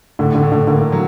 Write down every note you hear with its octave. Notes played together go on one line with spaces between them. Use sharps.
A2 D3
D3
A2
D3
D3 A#3
F#3